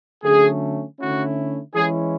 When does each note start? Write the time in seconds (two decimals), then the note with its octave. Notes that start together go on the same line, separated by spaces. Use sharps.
0.24 D3 F#3 A3 C#4 G#4
0.99 D3 A3 C#4 E4 F#4
1.74 E3 G#3 C#4 E4 G#4